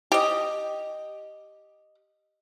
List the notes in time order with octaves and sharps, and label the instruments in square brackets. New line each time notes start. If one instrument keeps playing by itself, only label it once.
[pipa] G4 D#5